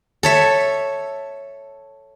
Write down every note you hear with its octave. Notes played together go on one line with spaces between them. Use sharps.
A4 C#5 E5